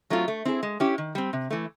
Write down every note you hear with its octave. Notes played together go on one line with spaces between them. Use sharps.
F#3 A3 C4 F4
A3
C4 E4 G#4
G#3
C#4 E4 G4
D#3
G3 C4
C3
E3 A3